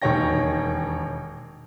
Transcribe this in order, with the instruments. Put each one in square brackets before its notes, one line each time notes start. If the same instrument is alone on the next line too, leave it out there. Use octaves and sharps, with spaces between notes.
[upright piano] E1 D#2 D#3 C#5 G5 A#6